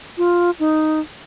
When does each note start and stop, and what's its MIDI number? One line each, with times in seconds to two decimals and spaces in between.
0.18 0.51 65
0.60 1.00 63